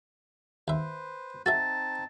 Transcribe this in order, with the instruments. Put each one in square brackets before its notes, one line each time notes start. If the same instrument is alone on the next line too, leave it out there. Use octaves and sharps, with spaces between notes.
[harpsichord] D#2 E5 [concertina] B4 C5
[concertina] C4 D#4 A5 [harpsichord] F#4 A4 E5 [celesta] A6